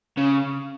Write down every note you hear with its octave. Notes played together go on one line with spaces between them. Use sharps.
C#3